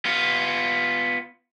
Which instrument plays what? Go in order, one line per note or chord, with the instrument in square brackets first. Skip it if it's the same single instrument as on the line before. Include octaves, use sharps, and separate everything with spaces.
[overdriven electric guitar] B3 F4